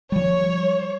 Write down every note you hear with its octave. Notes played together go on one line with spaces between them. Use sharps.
F3 G3 C#5